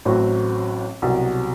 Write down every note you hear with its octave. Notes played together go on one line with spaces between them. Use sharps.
A1 A2 F#3 C4 F#4
C2 B2 F#3